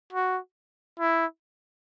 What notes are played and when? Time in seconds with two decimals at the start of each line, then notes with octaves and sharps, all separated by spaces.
0.13 F#4
1.00 E4